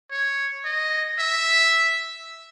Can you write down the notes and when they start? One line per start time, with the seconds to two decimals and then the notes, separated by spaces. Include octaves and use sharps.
0.11 C#5
0.65 D#5
1.19 E5